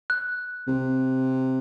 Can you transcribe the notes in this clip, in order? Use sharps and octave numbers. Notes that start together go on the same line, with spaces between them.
F#6
C3